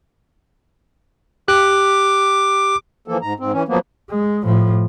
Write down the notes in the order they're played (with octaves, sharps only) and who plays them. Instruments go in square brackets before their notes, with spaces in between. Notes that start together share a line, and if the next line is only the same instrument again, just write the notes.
[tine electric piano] G4 F#6 [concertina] D6
[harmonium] E3 F3 A#3 A4
G#2 A#5
G#2 C4
E3 C#4
F3 F#3 A#3 B3
[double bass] G#3
A2 F3